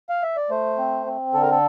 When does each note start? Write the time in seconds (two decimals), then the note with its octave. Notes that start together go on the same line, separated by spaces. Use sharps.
0.09 F5
0.23 E5
0.37 D5
0.50 A3 C5
0.78 C4
1.06 C4
1.34 D3 A4
1.42 A#4
1.51 A4